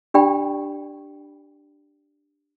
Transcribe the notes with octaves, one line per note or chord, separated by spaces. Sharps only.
D4 G4 D5 G5 B5